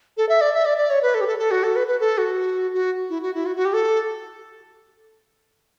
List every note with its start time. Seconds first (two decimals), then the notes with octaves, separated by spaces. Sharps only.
0.17 A4
0.29 E5
0.41 D5
0.54 E5
0.66 D5
0.78 D5
0.90 C#5
1.03 B4
1.15 A4
1.21 G4
1.27 A4
1.39 A4
1.51 F#4
1.63 A4
1.76 B4
1.87 B4
2.00 A4
2.18 F#4
2.74 F#4
3.10 E4
3.22 F#4
3.34 E4
3.46 F#4
3.56 F#4
3.65 G4
3.74 A4